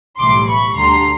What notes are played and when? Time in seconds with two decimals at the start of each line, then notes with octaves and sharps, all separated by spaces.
0.18 B1 A2 E3 G3 C6 D6
0.47 B5 C#6
0.75 D2 D3 G3 A#5 C6